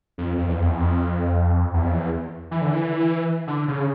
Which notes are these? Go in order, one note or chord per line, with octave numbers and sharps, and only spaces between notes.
F2
F2
E2
F2
E2
F2
E2
F2
E2
E3
D3
E3
D3
C#3